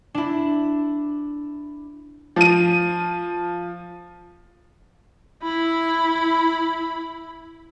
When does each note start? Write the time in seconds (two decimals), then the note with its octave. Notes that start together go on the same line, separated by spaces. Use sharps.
0.14 D4 E4
2.36 F3 D#7
5.42 E4 B5